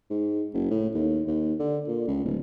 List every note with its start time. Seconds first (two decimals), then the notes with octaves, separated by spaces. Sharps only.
0.10 G#2
0.54 F#1
0.71 A2
0.95 D#2
1.28 D#2
1.59 D3
1.88 A#2
2.07 C#2
2.25 D1